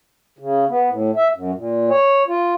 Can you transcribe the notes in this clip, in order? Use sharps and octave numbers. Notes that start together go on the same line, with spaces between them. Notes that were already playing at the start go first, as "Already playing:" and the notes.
C#3
B3
A2
E5
F#2
A#2
C#5
F4